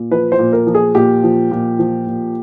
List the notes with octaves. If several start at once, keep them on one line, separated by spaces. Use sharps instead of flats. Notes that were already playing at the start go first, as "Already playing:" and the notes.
Already playing: A#2
F3 B4
C5
A#2
A#4
F3
G#4
A#2 G4
F3
A#2
F3
A#2